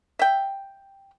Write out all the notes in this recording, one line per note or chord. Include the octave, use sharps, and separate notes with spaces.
E5 G5